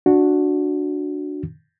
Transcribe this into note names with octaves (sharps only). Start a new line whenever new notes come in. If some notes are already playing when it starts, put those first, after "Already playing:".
D4 F#4